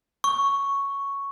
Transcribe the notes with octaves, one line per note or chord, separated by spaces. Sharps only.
C#6